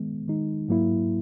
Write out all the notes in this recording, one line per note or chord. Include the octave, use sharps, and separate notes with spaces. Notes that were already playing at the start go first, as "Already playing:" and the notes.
Already playing: D#3 G#3 B3
D#3 G#3 D#4
G#2 F#3 A#3 E4